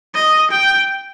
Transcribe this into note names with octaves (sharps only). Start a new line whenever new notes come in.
D#5
G5